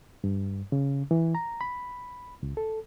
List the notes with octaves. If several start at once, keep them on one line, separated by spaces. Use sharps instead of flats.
G2
C#3
E3
A#5
B5
C#2
A4